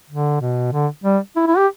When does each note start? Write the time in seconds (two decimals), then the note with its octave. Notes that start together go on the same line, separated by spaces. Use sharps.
0.10 D3
0.41 B2
0.73 D3
1.04 G3
1.36 E4
1.47 E4
1.57 G4